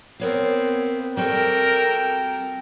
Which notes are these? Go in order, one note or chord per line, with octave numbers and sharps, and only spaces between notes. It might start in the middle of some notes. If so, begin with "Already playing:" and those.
B3 C4 A#4 C#5 F5
G3 C4 F#4 A4 A#4 G5